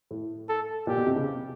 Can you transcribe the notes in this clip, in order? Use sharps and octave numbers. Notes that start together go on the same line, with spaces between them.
A2
A4
A#2 G4
B2
C3
C#3